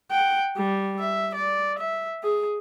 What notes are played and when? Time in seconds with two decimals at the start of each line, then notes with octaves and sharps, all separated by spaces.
0.11 F#5 G5
0.57 G3
0.99 E5
1.35 D5
1.79 E5
2.23 G#4